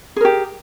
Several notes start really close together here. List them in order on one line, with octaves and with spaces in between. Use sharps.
G#4 A#4 G4